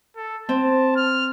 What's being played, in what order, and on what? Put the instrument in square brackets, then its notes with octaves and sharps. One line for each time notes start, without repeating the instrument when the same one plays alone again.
[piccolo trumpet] A4
[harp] C4 [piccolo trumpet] A5
[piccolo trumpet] F6